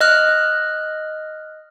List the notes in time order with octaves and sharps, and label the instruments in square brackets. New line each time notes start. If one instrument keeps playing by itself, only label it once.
[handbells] D#5 F6 F#6